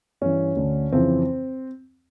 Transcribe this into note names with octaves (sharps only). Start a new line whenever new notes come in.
G2 E3 C#4
D2 D3
F2 C#3 E3 C4